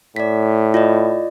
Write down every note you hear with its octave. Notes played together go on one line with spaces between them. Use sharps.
A2 D5 B6
F4 D5 D#5